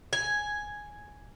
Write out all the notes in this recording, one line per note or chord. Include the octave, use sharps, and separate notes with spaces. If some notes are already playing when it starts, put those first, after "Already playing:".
G#5